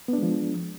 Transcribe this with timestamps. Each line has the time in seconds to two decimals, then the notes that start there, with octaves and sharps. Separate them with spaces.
0.08 B3
0.13 D4
0.18 G#3
0.23 F3